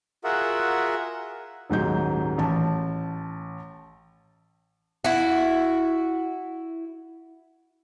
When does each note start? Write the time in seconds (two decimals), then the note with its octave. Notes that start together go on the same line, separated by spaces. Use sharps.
0.24 F4 F#4 G#4 A#4 E5 F#5
1.70 D#1 G#2 F#3 G6
2.38 A1 A5
5.04 E4 F#4